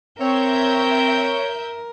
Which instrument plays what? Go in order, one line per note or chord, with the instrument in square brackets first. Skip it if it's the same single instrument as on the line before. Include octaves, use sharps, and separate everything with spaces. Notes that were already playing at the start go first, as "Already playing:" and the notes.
[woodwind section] C4 [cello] A#4 [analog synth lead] C#5 [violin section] E5 G6